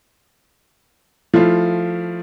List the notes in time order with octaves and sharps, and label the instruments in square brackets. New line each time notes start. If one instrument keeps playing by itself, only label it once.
[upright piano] F3 A3 E4 F4